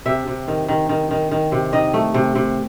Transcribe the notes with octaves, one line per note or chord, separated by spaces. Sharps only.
C3 E5
C3
D#3
D#3
D#3
D#3
D#3
C3
D#3 D#5
A3
C3
C3